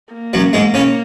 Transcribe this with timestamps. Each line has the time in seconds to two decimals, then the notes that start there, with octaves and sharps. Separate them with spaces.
0.13 A#3
0.33 F#2 F#3
0.53 G#2 G#3
0.74 C#3 C#4